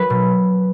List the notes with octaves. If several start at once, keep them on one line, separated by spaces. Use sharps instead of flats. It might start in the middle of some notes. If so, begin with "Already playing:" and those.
Already playing: F#3 B4
B2